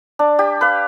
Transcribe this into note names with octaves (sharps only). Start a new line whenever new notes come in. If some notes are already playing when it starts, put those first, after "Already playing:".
D4
G4
B4 F5